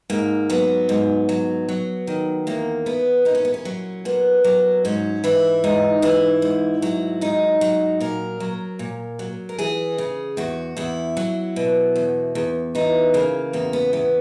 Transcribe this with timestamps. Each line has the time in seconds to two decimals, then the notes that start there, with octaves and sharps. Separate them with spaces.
0.10 G#2 A#3
0.50 F#3 B3
0.89 G#2
1.29 F#3
1.69 F#3
2.07 D#3
2.47 E2 A#3
2.86 E2 B3
3.25 A#2 D#4
3.35 C#4
3.45 B3
3.54 C#4
3.65 F#3
4.05 A#2 B3
4.44 F#3
4.85 G#2 C#4
5.24 E3 E4
5.64 G#2 D#4
6.02 E3 E4
6.42 G#2
6.82 F#3
7.21 G#2 D#4
7.61 F#3
8.00 A#2 A#4
8.40 F#3
8.79 A#2
9.19 F#3
9.49 A#4
9.59 E3 G#4
9.98 C#3
10.37 E2 F#4
10.77 E2 E4
11.17 F#3
11.56 B2
11.96 E2
12.35 E2
12.75 E3 D#4
13.14 C#3 A#3
13.53 E2 A#3
13.73 B3
13.93 E2 B3